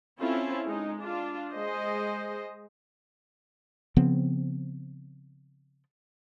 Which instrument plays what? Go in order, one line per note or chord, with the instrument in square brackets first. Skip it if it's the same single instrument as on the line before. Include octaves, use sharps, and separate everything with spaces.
[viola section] C4 C#4 E4 F4 A4
G#3 D#4
D4 F4
G#3 C5 D#5
[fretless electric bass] C#3 F3 B3 C4